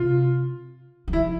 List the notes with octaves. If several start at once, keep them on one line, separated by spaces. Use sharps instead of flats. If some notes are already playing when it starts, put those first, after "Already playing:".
Already playing: C3 F4
E3
F3 E4